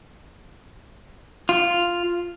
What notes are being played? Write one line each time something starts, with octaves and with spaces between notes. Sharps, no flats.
F4